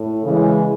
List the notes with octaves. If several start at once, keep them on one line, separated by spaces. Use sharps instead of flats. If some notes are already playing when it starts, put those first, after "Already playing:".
Already playing: A2
C#3 E3 G#3